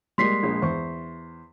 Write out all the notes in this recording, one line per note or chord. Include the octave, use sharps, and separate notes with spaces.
G3 G#3 A#3 C6 B6 C7
A#1 G#3
E2 C5 C#6